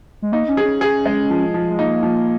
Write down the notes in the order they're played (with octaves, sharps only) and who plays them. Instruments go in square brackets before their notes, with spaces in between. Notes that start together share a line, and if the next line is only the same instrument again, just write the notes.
[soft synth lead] G#3
[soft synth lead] A#3 [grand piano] D#4
[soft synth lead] C#4
[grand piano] G#4
[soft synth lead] C#4
[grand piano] G#4
G#3
F3
F3
[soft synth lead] G#3
[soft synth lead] A#3 [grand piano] D#4
[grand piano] F3